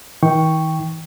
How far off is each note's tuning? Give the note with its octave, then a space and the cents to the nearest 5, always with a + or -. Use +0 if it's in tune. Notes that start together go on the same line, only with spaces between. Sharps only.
D#3 +45 G5 +0 C#6 +0